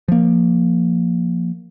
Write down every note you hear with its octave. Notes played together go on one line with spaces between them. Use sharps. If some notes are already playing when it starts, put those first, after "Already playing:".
F3 A#3